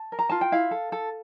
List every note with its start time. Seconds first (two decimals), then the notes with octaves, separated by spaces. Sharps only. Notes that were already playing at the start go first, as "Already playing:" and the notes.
Already playing: A5
0.12 A#4
0.19 A#5
0.29 F4 A5
0.41 G5
0.52 E4 F5
0.71 A4
0.92 A4